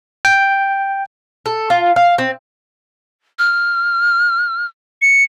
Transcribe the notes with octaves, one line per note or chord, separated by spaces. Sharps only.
G5
A4
F4
F5
C4
F6
C#7